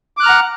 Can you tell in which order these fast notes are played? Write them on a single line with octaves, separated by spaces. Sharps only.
D6 F#6 F6 A#5 F#5